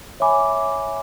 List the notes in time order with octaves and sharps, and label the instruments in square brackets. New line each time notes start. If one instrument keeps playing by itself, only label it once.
[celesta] C#5 E5 G#5 B5 D6